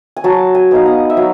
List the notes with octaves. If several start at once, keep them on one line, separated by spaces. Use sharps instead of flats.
G#5
F#3 A5
G#5
B3 D#4 F5
F#5
E5
F#3 F5